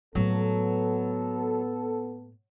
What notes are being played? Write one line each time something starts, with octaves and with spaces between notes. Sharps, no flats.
A2 F#3 A#3 B3 A4